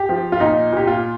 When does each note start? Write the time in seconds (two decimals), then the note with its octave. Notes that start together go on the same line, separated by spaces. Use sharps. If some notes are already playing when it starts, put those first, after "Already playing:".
Already playing: G4
0.09 F3
0.32 F4
0.40 A#2 D#4
0.72 A#2 G4
0.87 F4